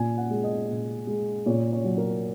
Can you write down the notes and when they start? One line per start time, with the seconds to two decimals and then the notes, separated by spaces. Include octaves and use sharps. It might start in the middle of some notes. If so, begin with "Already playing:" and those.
Already playing: A#2 G#5
0.17 F#5
0.30 G#3
0.44 D#5
0.69 A#2
1.07 G#3
1.46 A#2 C#5
1.73 C#5
1.85 F#3
1.98 A#4